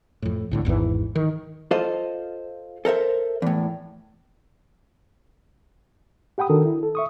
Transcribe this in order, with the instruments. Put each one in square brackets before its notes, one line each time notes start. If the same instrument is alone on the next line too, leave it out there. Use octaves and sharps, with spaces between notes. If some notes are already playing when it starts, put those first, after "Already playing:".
[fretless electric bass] F2 A2
C2 A2 D3
G#1 E2 G#2 E3
D#3
[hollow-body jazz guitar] F4 A4 C5 D#5
A4 A#4 C5 E5
E2 A2
[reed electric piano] G4 F#5 G5 B5 D#6
D#3 D4 F#4 A4 A#4
E4
A4
E5 C#6 D#6